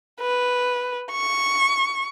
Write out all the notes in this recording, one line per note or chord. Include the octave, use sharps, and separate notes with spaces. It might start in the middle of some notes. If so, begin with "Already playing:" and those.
B4
C#6